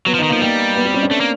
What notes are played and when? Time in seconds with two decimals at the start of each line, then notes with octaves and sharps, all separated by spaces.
0.06 F#3 B3
0.14 F3
0.18 D#4
0.23 D#3
0.29 A#3
0.33 F3
0.41 G3 A#3
0.76 B3
0.85 C4
0.94 C#4
1.03 D4
1.11 A3
1.21 A#3